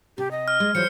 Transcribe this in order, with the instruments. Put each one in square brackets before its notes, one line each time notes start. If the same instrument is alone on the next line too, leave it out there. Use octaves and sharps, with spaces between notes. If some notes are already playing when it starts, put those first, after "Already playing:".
[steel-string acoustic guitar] C3 [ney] G4
[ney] D#5
[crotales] F6
[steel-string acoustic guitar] G#3
[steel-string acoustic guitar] E3 F#3 F4 [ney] C5 [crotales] C#7